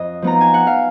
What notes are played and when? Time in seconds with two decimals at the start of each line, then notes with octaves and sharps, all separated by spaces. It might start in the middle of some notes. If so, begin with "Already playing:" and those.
Already playing: F2 D#5
0.22 F3 B3 D#4 A#5
0.41 G#5
0.54 F#5
0.67 F5